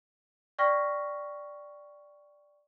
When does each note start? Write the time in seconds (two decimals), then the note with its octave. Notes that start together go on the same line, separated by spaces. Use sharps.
0.59 D5 G5 C#6 F6 A#6 B6